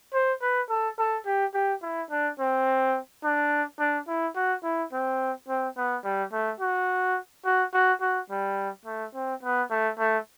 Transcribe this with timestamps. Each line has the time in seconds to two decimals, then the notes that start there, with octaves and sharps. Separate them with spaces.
0.13 C5
0.42 B4
0.69 A4
0.99 A4
1.25 G4
1.54 G4
1.82 E4
2.10 D4
2.39 C4
3.24 D4
3.79 D4
4.07 E4
4.35 F#4
4.63 E4
4.92 C4
5.48 C4
5.77 B3
6.04 G3
6.33 A3
6.60 F#4
7.45 F#4
7.73 F#4
8.01 F#4
8.30 G3
8.85 A3
9.14 C4
9.43 B3
9.70 A3
9.99 A3